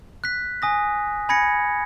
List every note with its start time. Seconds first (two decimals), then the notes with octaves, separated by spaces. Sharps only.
0.24 F#6 B6
0.62 G#5 D#6 A#6
1.29 G#5 B5 G#6 A#6 C#7